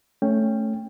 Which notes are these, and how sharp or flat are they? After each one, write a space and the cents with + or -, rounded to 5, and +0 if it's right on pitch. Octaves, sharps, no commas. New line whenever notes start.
A3 +0 C#4 +0 G5 +10